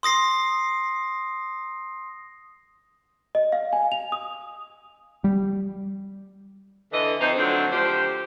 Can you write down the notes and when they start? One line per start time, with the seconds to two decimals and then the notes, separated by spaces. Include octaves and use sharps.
0.03 C6 D#6 A#6 C7
3.35 D#5
3.52 F5
3.73 G#5
3.92 F7
4.12 D#6
5.24 G3
6.92 D3 E3 D#5
7.20 F2 D#4 C5
7.38 D3 F3 F#3 A3 C4 D4
7.71 D2 F3 G4 C5